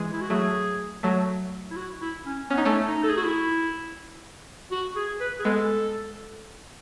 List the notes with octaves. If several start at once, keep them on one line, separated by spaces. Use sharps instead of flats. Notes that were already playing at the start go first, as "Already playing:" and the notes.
Already playing: E3 G#3
E4
F#4
F#3 A3 G#4
F#3 A3
E4
F#4
E4
C#4
B3 C#4
D#4
A3 C#4
D#4
A4
G#4
F#4
E4
F#4
G#4
B4
G#4
G#3 B3 A4